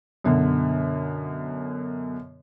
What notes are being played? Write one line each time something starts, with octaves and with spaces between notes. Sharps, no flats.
F#2 B2 D3